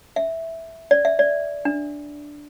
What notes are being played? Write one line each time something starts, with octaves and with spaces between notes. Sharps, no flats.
E5
D5
E5
D5
D4